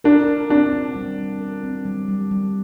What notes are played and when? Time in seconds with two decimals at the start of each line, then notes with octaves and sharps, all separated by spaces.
0.04 D4 A#4
0.27 A#4
0.50 C4 D4
0.73 C4
0.95 G3
1.18 C4
1.41 A#4
1.64 C4
1.86 G3
2.08 G3
2.31 G3